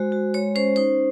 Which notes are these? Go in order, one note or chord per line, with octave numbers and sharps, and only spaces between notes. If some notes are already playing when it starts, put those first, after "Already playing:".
Already playing: G#3 F#4 C5
F#4
G#3 C#5
C#4 C5
D#4 C5